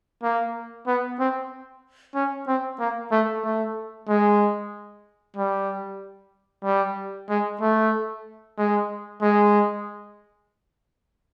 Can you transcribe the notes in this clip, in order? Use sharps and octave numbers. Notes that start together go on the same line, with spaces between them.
A#3
B3
C4
C#4
C4
A#3
A3
A3
G#3
G3
G3
G#3
A3
G#3
G#3